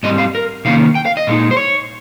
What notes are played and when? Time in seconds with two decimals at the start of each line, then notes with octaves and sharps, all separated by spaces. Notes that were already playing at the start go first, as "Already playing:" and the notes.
0.03 G#2 G3 C4 D#5
0.18 F5
0.35 A#4
0.65 C3 D#3 A#3 C#4 F5
0.95 G5
1.06 F5
1.17 D#5
1.27 A#2 G#3 D#4
1.51 C5
1.57 C#5